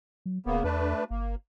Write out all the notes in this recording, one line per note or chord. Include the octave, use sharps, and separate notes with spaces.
F#3
D1 C#3 A#3 B3
E2 A3 D4 B4
G1 A#3